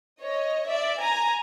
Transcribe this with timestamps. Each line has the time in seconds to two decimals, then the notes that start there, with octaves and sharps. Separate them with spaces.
0.22 C#5 D#5
0.70 D5 E5
1.01 G#5 A#5